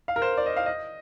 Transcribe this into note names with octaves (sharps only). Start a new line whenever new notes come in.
F5
A#4
C5
D5
D#5
F5
D#5